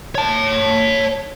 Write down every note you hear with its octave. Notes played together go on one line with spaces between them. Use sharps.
C#5 A5